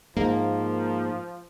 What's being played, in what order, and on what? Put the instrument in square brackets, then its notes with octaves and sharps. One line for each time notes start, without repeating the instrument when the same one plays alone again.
[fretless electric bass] G#2 [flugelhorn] F3 [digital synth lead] A#3